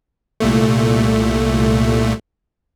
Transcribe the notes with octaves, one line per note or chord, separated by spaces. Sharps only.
C2 A#2 A3